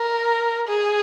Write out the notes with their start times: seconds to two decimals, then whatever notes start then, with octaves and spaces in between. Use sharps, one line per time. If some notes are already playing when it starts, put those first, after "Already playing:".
Already playing: A#4
0.68 G#4